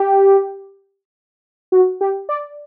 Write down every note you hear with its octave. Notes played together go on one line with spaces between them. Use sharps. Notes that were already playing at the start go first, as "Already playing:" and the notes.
Already playing: G4
F#4
G4
D5